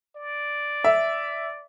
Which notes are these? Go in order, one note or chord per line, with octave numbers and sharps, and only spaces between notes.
D5
E5